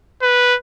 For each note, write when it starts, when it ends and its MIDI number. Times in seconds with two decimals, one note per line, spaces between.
0.22 0.56 71